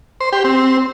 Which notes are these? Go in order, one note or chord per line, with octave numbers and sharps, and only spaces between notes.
C5
G4
C4